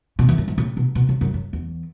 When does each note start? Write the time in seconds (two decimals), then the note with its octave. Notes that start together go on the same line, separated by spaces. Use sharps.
0.19 B2
0.29 E2
0.38 F#2
0.48 G#2
0.58 A2
0.77 B2
0.95 B2
1.09 C#3
1.21 F#2
1.34 F#2
1.53 E2